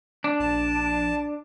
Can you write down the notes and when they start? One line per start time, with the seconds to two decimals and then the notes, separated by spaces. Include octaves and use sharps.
0.24 D4
0.40 A#1 A5